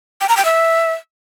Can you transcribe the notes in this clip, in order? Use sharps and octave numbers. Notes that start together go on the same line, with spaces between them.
G5
A#5
G5
E5